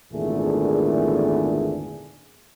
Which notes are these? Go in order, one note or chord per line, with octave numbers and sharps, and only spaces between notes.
G#1 E2 A#2 D3 A3 G#4